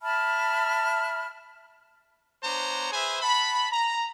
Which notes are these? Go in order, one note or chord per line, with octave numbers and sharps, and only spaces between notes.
E5 A5 B5 F6
B3 D4 C5 C#5 A#5
G#4 B4 C5 E5 G#5
F#5 A5 B5
A#5